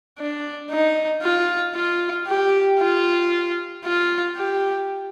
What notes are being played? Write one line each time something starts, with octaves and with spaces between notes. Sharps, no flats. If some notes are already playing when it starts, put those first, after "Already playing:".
D4
D#4
F4
F4
G4
F4
F4
G4